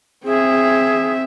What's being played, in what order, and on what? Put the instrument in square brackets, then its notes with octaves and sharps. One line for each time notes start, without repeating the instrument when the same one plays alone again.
[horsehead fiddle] C4 E5 [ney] G#4